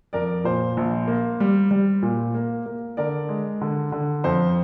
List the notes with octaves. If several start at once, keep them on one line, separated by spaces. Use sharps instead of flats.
F2 A#4 D5
A#2 C5
A#1
A#3
G3
G3
A#2
A#3
A#3
D3 A#4 D5
G#3
D3
D3
F2 C5